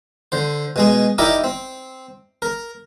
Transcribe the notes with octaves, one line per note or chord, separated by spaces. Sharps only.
D3 C5
B2 G#3 G#4
D#4 E4 G4 A#4 D5 D#5
C4
A#4